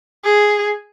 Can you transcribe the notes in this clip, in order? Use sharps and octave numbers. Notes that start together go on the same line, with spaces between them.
G#4